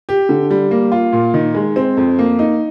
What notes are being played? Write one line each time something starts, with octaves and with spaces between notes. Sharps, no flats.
G4
D3
G3
A#3
F4
A#2
D#3
G#3
C4
F2
A#3
D#4